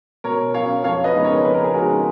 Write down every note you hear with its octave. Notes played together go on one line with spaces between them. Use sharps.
B2 A#4 C#5
F#3 C#4 C#5 F5
F2 C#5 F5
B4 D#5
C#3 G#3 B3 D#4
A#4 C#5
F2 B4
A#4
G#4
C#3 G#3 B3 D#4 F#4 A#4